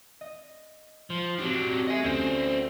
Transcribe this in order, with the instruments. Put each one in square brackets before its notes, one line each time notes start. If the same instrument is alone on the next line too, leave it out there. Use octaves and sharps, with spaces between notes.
[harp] D#5
[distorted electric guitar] F3
[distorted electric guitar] F#3 D4 [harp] C4 G4
[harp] A3 F#4 C#7 [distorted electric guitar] D#5 G#5
[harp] D2 [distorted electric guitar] C#4 C5